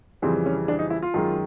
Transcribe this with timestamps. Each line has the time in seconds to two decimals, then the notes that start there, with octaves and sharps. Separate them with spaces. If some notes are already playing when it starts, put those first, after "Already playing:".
0.22 F2 C#3 E3 G3 C4
0.46 C#4
0.68 D4
0.79 D#4
0.90 E4
1.03 F4
1.14 F#2 D#3 G#3